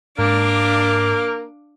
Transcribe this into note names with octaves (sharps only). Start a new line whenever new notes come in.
G#2 A#3 D4 A#4 F5 D6